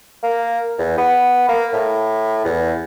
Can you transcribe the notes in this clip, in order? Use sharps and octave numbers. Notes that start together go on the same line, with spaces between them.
A#3
E2
B3
A#3
A2
E2